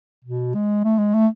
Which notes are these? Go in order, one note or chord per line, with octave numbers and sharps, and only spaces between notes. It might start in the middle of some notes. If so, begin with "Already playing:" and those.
B2
G#3
A3
G#3
A3